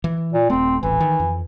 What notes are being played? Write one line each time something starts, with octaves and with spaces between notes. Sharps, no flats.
E3
A#2
D#1 A3 C4
D#1 A1 E3
D#3
F2